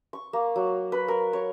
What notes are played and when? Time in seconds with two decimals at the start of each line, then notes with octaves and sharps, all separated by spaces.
0.13 C#6
0.33 A#3
0.56 F#3
0.92 B4
1.08 A#4
1.33 C#5